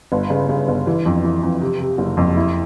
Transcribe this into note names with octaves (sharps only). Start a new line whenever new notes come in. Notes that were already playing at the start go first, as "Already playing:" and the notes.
G1
C#3
C#3
G1
E3
F2
E3
F2
C3
C3
F#1
F2
E4